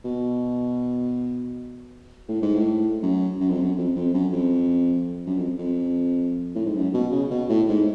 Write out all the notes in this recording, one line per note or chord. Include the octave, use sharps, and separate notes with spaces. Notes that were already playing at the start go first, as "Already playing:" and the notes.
B2
A2
G#2
A2
F#2
F#2
F2
F#2
F2
F2
F#2
F2
F#2
F2
F2
A2
G#2
F#2
B2
C#3
B2
A2
G#2